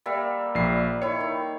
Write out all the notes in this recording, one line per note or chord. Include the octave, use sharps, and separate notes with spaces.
G3 A#3 E5
A#1 C7
D#3 E4 C#5 C#7
D#3